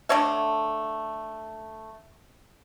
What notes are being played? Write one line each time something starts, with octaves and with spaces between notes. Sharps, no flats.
D3 A3 C#5 E5